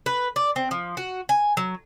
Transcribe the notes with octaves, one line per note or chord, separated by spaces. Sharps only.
B4
D5
C4
F3
F#4
G#5
F#3